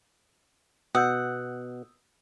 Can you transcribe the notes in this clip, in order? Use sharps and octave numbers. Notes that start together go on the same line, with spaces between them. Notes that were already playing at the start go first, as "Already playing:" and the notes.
B2 F#5 D#6 E6 G6